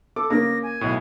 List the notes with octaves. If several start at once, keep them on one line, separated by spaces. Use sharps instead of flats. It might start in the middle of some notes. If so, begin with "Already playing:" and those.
A4 D6
C#3 A#3 A#6
G#5
B1 A2